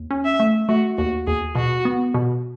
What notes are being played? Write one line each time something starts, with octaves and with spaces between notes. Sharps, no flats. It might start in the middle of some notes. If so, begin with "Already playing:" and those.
Already playing: D#2
C#4
E5
A3
A3 F#4
D#2 F#4
D#2 G#4
B2 F#4
B3
B2